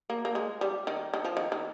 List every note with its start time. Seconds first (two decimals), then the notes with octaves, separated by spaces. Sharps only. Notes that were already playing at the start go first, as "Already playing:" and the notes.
0.10 A#3
0.25 A#3
0.35 G#3
0.61 G3
0.87 D#3
1.14 D#3
1.25 F3
1.37 D#3
1.52 D#3